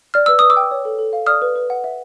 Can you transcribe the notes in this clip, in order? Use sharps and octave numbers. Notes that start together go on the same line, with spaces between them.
D5 F6
B4 E6
B4 D#6
D6 E6
G5
C#5
A4
A4
F5
D5 D#6 F6
B4
B4
F#5
E5